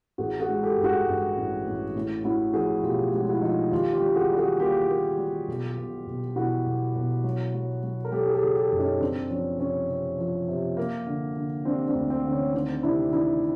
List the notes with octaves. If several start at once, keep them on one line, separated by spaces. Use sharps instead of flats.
A1 F#4 G#4
F#4 G#4
G#3
G4 A4
G2
F#4 G#4
G2
A1
A1
A2
A2 E4 F#4
F3 F#4 G#4
B1 F4 G4
G#3 F#4
F4
E4 F#4
F3 D#4 F4
D#2 F4 G4
F4 G4
G3
F#4 G#4
G3
F#4 G#4
A#3 F4 G4
A#3
G3
B1
B2
B1
B2 E4 F#4
B1
B1
F#3
F#3
F#3
A#4
F#3 G4 A4
G#4
G4 A4
C#3
G4 A4
F#1
C#4 D#4
F#1 C4 D4
F3 C#4
C3 C#4
C3
F3
C3
A#3
D3
D3
G3 C4 D4
C4 D4
D2
C4
D3
C#4
D#3 C4 D4
C3 D4 E4
D#3 D4 E4